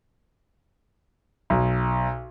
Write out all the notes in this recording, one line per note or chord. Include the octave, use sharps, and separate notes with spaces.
B1